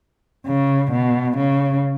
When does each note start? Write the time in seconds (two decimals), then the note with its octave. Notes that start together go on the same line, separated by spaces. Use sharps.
0.47 C#3
0.92 B2
1.37 C#3